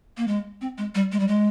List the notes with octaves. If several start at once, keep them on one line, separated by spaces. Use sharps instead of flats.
A#3
G#3
C4
G#3
G3
G#3
G3
G#3